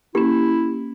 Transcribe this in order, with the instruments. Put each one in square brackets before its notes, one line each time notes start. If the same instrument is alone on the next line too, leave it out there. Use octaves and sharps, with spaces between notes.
[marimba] A#3 C#4 [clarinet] E4 [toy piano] G4